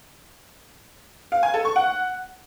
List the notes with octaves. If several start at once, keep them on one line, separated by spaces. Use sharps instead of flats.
F5
G#5
A4
C#6
F#5